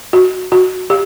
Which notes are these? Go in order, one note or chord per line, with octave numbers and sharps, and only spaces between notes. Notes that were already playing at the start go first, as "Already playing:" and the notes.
F#4
F#4
G4